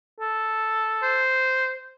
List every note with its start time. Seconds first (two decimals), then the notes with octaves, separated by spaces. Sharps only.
0.20 A4
1.03 C5